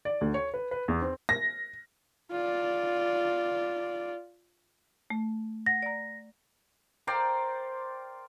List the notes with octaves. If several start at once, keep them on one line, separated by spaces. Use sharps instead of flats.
D5
D2
C#5
B4
B4
E2
C4
A#6
F4 D5
A3
F#5 A#6
D5 A#5
A#4 C5 D5 G5